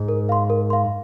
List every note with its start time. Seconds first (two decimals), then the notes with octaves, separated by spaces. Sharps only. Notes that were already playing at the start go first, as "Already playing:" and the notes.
Already playing: G#2
0.08 A#4
0.29 F5 C6
0.50 A#4
0.70 F5 C6